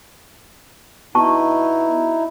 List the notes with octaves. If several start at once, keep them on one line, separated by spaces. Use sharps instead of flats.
B2 D#4 E4 A5 C#6